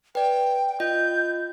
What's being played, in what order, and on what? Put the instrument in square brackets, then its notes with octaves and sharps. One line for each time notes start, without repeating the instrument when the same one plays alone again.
[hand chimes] B4 D5 [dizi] G5
[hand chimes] F4 D#5 [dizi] G6